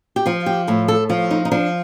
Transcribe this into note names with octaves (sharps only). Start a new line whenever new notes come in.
G4
F3 F4
G4
A2 A4
A4
F3 F4
D#4
D#4
F3 D4